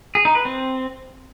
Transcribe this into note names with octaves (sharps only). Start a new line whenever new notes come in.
G#4
D#4
B4
C4